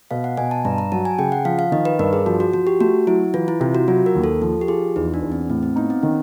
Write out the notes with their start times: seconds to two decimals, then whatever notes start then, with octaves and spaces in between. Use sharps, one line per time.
0.11 B2 F5
0.24 F#5
0.37 B2 G#5
0.51 A5
0.65 G2 A#5
0.78 A#5
0.92 F#3 A5
1.05 G#5
1.18 C#3 G5
1.32 F#5
1.45 F3 F5
1.59 F5
1.72 D#3 D#5
1.85 B4
1.99 G2 A#4
2.13 G#4
2.26 F3 F#4
2.40 F#4
2.53 F3 F#4
2.67 G4
2.80 A3 F#4
3.07 F#3 E4
3.34 E3 F4
3.48 E4
3.60 C3 F4
3.75 F#4
3.88 F#3 F4
4.06 A#4
4.15 D#2
4.24 A4
4.42 F3 A4
4.61 G4
4.68 F4 G#4
4.96 E2 D#4
5.14 D4
5.22 E2
5.32 C4
5.50 A2 C4
5.63 C4
5.76 B3 D#4
5.90 C4
6.03 D#3 C#4